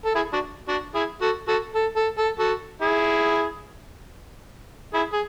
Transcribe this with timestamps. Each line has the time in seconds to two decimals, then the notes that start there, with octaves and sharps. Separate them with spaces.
0.05 A4
0.15 E4 G#4
0.33 D4 F#4
0.68 D4 F#4
0.95 E4 G#4
1.21 F#4 A4
1.48 F#4 A4
1.75 A4
1.96 A4
2.18 A4
2.39 F#4 A4
2.81 E4 G#4
4.93 E4 G#4
5.13 G#4